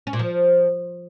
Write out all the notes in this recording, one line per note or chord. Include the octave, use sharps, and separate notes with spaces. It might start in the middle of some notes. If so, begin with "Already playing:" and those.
C#4
A#2
F3